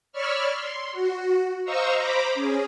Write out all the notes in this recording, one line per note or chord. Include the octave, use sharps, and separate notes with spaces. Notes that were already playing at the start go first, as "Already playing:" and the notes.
C#5 D5 B5 C#6 E6 F6
C6
F#4
C5 D#5 F5 A#5 C#6 E6
C5 A#5 B5 D6
C#4 G#4